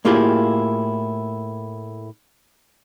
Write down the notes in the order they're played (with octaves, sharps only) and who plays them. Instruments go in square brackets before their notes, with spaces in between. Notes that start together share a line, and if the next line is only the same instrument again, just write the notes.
[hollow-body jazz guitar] A2 A#3 E4 F4 G4 G#4